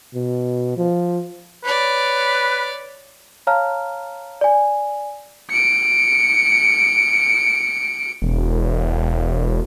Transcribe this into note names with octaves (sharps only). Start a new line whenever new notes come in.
B2
F3
B4 C#5 D5
C#5 F5 A5 A#5 F6
D5 G#5
C#7 D7
E1